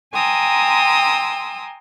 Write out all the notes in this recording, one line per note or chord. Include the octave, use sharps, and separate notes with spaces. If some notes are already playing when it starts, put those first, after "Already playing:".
G5 G#5 A#5 C6 D#6 E6